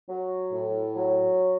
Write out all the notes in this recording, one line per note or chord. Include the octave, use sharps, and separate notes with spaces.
F#3
A2
F#3